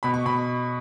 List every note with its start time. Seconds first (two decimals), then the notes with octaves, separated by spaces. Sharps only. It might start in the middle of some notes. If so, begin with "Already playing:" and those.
0.03 B2 B5
0.14 C#6
0.25 B2 B5